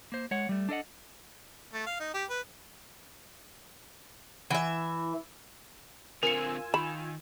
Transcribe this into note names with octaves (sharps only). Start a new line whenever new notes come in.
A#3 C5
G#3 C#5 F#5
G3 A3
D4 A4 D#5 F#5
A3
F5
D#4
G4
B4
E3 E5
D3 C4 F4 A#4 G#5 E6 C#7
D#3 B5 E7